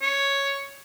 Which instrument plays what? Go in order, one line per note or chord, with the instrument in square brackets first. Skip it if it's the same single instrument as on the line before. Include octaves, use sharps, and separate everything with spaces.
[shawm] C#5